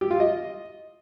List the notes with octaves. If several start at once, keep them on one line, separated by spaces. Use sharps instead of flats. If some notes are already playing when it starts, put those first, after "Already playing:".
G4
F4
D#5